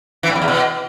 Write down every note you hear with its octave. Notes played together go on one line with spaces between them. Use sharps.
E3
A2
F2
E2
B2